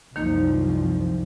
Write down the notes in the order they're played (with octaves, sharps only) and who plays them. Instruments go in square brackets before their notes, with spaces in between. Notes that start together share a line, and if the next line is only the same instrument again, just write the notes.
[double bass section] C2 F#2 F3 [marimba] D#3 A#3 D#4